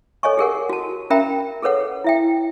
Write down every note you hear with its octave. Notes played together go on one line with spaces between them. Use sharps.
A4 C#5 D#5 G#5 C#6
G4 G#4 A#4 F#5
F#4 A5
C#4 A#4 E5 G5 A#5 B5
G#4 A4 B4 C#5 F#5
E4 E5 G5